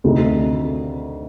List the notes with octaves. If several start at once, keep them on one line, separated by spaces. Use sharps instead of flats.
D2 C3 D#3 A3 D#4